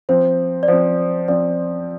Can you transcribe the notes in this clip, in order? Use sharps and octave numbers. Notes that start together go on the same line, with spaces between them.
F3 C4 C5
D5
F3 C4 C5
F3 C4 D5